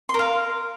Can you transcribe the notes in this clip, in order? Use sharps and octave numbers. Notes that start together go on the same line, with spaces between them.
A#4 F5 C6